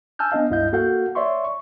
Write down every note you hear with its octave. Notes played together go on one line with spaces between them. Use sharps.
G#5 A5 E6 F6 G6
B3 D4 D#5 F5
C#2 G2 E4 D#5 F5 G6
A#3 F#4 A4 F5 F#5 G6
C#5 D5 E5 C6 C#6
C#6